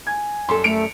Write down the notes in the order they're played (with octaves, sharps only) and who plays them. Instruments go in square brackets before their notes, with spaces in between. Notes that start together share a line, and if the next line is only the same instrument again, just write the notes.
[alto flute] G#5 [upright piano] G#6
[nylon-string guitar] F#2 G3 A4 [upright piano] C6
[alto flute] A3 [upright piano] C#7 D7 F7